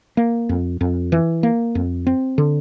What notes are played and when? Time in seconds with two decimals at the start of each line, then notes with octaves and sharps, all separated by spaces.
0.17 A#3
0.49 F2
0.81 F2
1.12 E3
1.43 A#3
1.75 F2
2.07 C4
2.38 D3